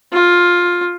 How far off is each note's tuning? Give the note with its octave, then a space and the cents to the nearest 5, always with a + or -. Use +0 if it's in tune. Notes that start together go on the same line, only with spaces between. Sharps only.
F4 +10